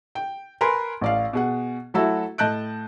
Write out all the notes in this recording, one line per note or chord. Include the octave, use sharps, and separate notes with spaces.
G5
A#4 B4 G#5 B5 C6
A1 D5 F5
B2 G#4 F#5
F#3 A3 E4 F#4 A4 E5
A2 D#5 A5 F#6 G6 D7